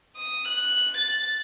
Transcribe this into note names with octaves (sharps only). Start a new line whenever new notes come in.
D#6
F#6
A6